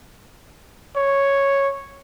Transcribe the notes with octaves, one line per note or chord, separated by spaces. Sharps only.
C#5